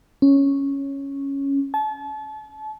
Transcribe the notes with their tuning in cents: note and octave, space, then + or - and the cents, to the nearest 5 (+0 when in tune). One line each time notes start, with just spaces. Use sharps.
C#4 +0
A5 -35